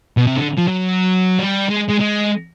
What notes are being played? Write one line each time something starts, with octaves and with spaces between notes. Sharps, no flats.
B2
C3
D3
F3
F#3
G3
G#3
G#3
G#3